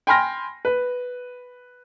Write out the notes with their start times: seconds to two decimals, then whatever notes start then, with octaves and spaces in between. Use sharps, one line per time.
0.07 G5 G#5 B5 C6 F6 A#6
0.65 B4